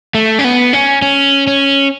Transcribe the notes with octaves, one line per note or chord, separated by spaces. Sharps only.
A3
C#4
B3
C#4
C#4
C#4